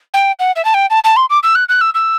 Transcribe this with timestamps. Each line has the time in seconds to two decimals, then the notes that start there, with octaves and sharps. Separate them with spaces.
0.14 G5
0.40 F#5
0.56 E5
0.65 A5
0.74 G5
0.90 A5
1.04 A5
1.16 C6
1.30 D6
1.43 E6
1.55 F#6
1.69 F#6
1.81 E6
1.95 E6